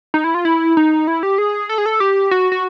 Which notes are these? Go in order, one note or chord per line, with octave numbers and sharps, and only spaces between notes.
D#4
E4
F4
E4
D#4
E4
G4
G#4
A4
G#4
A4
G4
F#4
F#4